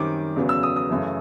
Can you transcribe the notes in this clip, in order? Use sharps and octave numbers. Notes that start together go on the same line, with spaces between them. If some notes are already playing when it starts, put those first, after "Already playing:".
Already playing: F#2 D#3 G3 C4 D6
E2 C#3 F#3 B3
E6
D#6
D#6
F#2 C#3 E3 A3